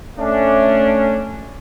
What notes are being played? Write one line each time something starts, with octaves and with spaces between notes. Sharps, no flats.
A3 C#4 D4